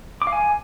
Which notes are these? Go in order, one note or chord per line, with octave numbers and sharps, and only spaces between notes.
D6
F5
G#5